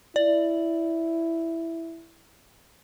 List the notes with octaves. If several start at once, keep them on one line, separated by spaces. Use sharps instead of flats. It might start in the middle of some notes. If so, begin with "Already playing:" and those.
E4 D5